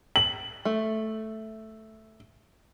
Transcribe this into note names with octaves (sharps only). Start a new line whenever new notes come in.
F#7
A3